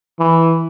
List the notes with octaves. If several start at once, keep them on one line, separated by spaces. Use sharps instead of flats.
E3